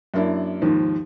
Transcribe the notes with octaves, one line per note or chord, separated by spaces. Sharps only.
F#2 A#3 D4 E4
D#2 G#2 D#3 F3